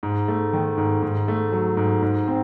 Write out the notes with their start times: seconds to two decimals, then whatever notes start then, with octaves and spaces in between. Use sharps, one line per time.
0.03 G#2
0.28 A3
0.53 D#3
0.78 G#2
1.02 G#2
1.28 A3
1.52 F#3
1.77 G#2
2.02 G#2
2.27 C4